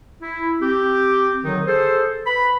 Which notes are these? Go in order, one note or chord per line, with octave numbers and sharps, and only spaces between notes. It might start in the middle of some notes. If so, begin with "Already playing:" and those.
E4
C4 G4
D3 D#3 F#3 D#4
G#4 A4 C5
B4 B5